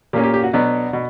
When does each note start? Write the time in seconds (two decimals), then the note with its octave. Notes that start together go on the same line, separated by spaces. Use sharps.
0.13 A#2 A#3 C#4 G4
0.24 G4
0.34 G4
0.43 F#4
0.53 B2 F#3 B3 D4
0.93 B2